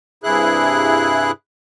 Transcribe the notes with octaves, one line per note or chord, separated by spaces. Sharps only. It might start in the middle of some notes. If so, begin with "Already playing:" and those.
G2 C3 E4 G#4 F#6